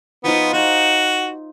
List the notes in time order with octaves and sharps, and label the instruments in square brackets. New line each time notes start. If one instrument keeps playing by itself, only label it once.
[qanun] F3 D#4 F4 [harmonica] B3
[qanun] D#4 [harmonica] F#4